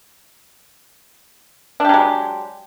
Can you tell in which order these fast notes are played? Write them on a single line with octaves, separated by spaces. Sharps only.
D4 G4 F#3 G#3